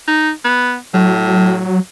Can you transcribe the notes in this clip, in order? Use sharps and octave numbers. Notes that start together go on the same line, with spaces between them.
D#4
B3
A2 F#3